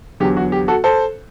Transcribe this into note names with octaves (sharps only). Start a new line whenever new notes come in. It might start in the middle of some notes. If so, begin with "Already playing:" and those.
E2 D3 F#3 G4
F#4
G4
F#4 A4
A4 C5